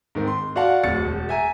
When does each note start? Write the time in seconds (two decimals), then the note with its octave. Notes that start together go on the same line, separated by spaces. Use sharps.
0.15 G#2 D#3 C4
0.27 C6
0.56 F#4 D5 F5 F#5 A5
0.83 D1 F2 A6 C#7
1.05 E1
1.29 E5 G#5 A#5